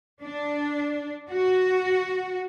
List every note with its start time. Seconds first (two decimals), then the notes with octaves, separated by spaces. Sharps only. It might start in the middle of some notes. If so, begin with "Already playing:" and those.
0.22 D4
1.29 F#4